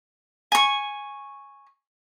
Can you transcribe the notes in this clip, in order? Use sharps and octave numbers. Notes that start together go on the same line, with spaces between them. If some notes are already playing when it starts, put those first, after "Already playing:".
G#5 C#6